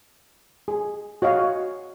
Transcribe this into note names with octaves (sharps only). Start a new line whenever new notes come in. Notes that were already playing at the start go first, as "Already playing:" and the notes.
G#4
F#4 C#5 D#5 F5